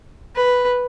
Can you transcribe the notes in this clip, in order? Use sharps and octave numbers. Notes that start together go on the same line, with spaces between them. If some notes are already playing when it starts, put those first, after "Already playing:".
B4